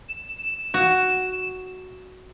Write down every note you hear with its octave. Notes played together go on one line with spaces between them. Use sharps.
E7
F#4